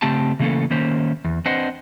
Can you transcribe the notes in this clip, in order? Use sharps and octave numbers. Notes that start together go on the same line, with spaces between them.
C#3 A3 C4 G4 A5
C#3 E3 A3 A#3 C#4 A4
D#3 A#3 C#4 C5
E2
C4 D4 B4 C5 D#5 F#5